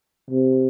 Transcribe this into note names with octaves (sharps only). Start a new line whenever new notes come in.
C3